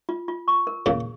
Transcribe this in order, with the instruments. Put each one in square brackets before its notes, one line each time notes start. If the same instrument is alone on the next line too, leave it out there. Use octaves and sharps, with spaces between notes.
[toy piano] F4
F4
C#6
A#4
[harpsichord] A#2 C#3 [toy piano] G#4